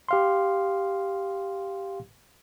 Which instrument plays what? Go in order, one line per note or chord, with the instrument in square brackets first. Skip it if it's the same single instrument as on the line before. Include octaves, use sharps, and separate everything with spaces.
[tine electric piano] G4 F5 C6